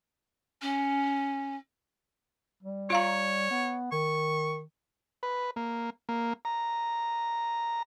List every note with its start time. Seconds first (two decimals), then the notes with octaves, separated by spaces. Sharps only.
0.62 C#4
2.62 G3
2.90 F4 C#5 F5 A#5
3.50 B3
3.92 D#3 C#6
5.23 B4
5.56 A#3
6.09 A#3
6.45 A#5